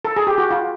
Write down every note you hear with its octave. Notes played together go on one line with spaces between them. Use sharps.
A4
G#4
G4
F#4
F4